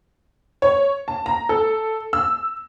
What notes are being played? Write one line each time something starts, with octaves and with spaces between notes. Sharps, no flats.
C#5
A5
A#5
A4
E6